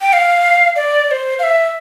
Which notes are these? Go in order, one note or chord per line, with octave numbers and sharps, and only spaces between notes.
G5
F5
D5
D5
C5
F5
E5